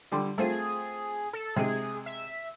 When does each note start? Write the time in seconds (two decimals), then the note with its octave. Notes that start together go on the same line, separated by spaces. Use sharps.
0.12 D3 G3 C6
0.38 A3 C4 F4 G#4
1.33 A4
1.56 C3 G#3 G#4
2.06 E5